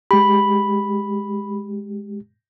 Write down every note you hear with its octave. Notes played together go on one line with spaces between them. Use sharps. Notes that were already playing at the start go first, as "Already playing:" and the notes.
G#3 G4 B5